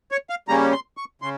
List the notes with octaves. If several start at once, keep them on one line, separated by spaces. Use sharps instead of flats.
C#5
F5
C#3 G3 A#3 C#4 A#5
C6
C#6
C#3 C6